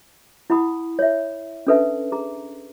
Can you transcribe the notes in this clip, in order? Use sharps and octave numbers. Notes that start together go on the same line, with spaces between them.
E4 F#5 B5 D#6
C#5 E5
C#4 D4 A4 B4 E5 A5
G#4 A#5